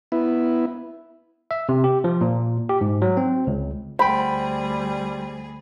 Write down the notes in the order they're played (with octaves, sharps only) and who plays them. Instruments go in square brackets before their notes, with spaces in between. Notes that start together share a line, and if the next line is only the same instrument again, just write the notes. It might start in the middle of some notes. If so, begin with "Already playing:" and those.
[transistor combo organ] B3 E4
[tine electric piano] E5
C3
G4
F3
A#2
G4
G#2
F#3
C4
C#2
[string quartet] D2 G#4 [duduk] G3 [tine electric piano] C5 G5 [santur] B5